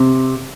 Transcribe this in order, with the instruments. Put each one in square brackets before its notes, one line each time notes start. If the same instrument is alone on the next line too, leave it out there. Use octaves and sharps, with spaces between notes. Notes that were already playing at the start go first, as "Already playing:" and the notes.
Already playing: [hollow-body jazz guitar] C3